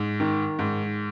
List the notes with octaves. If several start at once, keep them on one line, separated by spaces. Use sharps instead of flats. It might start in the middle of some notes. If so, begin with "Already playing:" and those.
Already playing: G#2
D#3
G#2